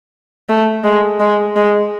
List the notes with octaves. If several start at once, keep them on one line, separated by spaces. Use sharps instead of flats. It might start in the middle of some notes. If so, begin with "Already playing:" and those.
A3
G#3
G#3
G#3